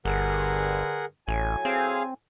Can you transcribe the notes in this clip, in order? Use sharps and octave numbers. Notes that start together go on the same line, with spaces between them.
G1 G2 D3 G#4 A#4 F#5
A1 A2 F#3 G#5
C4 G#4 F5